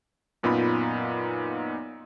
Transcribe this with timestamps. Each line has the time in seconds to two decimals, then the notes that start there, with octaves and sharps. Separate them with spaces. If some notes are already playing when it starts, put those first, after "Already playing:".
0.43 F#2 A#2 B3 D#4 F4 B5